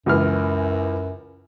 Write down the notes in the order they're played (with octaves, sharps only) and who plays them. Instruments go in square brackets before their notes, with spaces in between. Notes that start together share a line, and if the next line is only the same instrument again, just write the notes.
[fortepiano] C#2 E3 F6 [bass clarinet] F#2